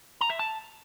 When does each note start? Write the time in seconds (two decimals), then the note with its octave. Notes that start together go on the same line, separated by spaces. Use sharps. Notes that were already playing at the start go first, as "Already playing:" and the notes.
0.21 A#5
0.30 E5
0.39 A5